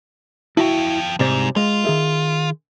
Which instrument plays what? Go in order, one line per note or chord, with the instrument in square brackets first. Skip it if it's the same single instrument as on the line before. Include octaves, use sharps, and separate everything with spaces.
[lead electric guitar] F3 G5 [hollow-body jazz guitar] E4 F#4
[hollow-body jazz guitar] C2 C3 D5 [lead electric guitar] G#2
[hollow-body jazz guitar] G#3 [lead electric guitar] F4
[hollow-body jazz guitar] D#3 G#4 E5